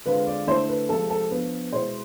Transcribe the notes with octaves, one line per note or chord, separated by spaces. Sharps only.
D3 G#3 C4 F4 B4
D5
D3 A3 E4 C5
B4
C3 F3 G#3 C4 A4
A4
F3 B3 D4 B4
B2 G#3 B3 E4 C5